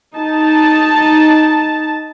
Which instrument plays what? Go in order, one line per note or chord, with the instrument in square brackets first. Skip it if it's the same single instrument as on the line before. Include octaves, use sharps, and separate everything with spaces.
[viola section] D#4 A5